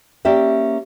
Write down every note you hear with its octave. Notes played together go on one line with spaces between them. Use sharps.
A#3 C#4 G4 D5 E5